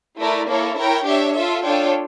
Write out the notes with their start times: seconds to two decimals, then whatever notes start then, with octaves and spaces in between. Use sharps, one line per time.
0.19 A3 E4 A#4 D5
0.48 A#3 E4 A4 C#5
0.77 E4 A#4 C#5 G5
1.06 D4 G4 C#5 E5
1.34 F4 A4 E5
1.63 D4 F4 A4 C#5 G5